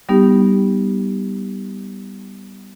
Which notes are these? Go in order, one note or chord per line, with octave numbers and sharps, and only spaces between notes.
G3 B3 D#4 G4